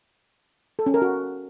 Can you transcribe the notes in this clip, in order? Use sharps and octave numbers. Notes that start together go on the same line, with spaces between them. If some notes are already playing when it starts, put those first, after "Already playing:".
A4
C#4
A#4
F#4